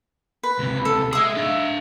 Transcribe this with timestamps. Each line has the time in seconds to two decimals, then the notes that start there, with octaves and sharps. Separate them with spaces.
0.43 B4
0.59 C#2 C3
0.85 A4
1.13 G#4 D#5 E5 D#6
1.36 D4 F5